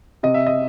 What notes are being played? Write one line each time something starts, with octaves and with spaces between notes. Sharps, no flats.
C3 D#5
E5
D#5